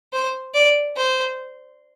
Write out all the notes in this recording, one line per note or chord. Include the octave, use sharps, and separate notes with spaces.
C5
D5
C5